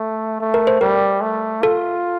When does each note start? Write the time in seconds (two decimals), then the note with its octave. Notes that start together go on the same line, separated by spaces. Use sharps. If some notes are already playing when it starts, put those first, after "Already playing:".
Already playing: A3
0.40 A3
0.54 A#4
0.67 C5
0.81 G3 A#4
1.21 A3
1.63 F4 A4